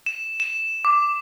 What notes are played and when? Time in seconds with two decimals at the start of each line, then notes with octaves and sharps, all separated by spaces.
0.06 E7
0.40 E7
0.85 D6